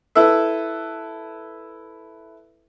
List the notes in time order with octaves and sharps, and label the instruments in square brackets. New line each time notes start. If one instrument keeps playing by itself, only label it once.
[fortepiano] E4 A4 B4 E5